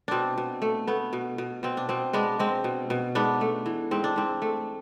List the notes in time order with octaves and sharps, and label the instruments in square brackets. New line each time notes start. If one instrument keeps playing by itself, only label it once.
[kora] B2 C4 D4
B2
A3
A3 B3
B2
B2
B2 C4
D4
B2 C4
G#3 B3 D4
G#3 C4
B2
B2
G#2 B3 D4
A3
E3
G#2 C4
D4
G#2 C4
A3